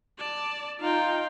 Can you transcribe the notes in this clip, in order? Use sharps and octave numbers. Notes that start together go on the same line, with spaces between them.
D5 A5
D#4 F4 F5 G5